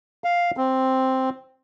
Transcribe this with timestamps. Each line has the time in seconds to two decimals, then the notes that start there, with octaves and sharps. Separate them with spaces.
0.24 F5
0.57 C4